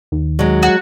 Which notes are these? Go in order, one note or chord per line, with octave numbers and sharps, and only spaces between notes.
D#2
F#3 G#3
F#4